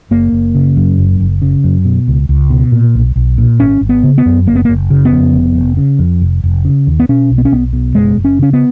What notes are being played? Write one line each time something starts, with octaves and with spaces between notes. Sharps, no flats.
F#1 A#3
F#1
C#3
F#2
F#1
F#1
C#3
F#2
B2
C#2
C#2
B2
A#2
B1
B1
A#2
G#1 C#4
G#1
B3
C#3
B3
F#2
F#1 A#3
B3
A#3
F#1
C#3
B3
F2
F1
F1
C#3
F2
F1
F1
C#3
D#2
B3
B2 C#4
B1
B3
C#4
B1 B3
B2
F#1 G#3
F#1
C#4
C#3 C#4
B3